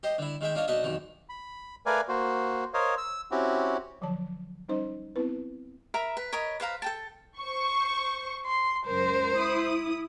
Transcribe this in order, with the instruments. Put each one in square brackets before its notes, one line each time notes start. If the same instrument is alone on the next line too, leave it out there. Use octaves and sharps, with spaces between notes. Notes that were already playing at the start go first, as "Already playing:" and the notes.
[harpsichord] G4 C5 D#5
D3 E4
D#3 G#3 E5 G5
D4 F4 C#5 D#5
B1 D4 D#4 D#5 E5 D#6
B1 F2 D#3 E3
[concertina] B5
A3 A#4 B4 D5 F5 G#5
A#3 F#4 C5
A#4 C5 C#5 D#5 F5
E6
C4 C#4 E4 F#4 G4
[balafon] D3 F3 F#3 C#5 A5
G3 C#4 D#4 C5 D#5
B3 C4 E4 B4
[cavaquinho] A#4 E5 A#5 B5
B4
A#4 C#5 D#5 B5
B4 C5 F5 A#5
A4 G5 A5
[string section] C5 C#6
[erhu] C6
[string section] C#2 F#2 A#4 [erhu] C5
[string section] E4 D#6